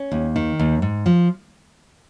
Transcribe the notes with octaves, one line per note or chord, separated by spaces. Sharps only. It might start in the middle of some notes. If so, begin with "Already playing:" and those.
Already playing: C#4
D#2
D#3
D#2
G#2
F3